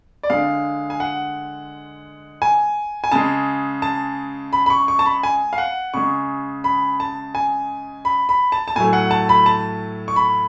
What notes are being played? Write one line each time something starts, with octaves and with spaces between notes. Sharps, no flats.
D5
D3 G#3 F5
G#5
F#5
G#5
G#5
C#3 G#3 A5
A5
B5
B5
C#6
C#6
A5
B5
G#5
F5
F#5
C#3 G#3 C#6
B5
A5
G#5
B5
B5
A5
A5
A2 F#3 A3 G#5
F#5
A5
B5
A5
C#6
B5